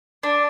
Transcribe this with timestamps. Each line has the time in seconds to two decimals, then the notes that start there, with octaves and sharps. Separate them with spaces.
0.23 D4